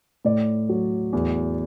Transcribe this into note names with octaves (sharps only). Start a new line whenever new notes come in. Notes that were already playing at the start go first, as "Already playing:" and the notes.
A2 D5
F#3
E2